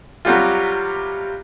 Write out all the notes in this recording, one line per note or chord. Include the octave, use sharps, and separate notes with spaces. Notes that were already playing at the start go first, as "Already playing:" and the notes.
C3 F#3 G3 F4